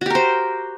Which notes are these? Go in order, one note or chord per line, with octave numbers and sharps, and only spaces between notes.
F#4 G4 A#4 C5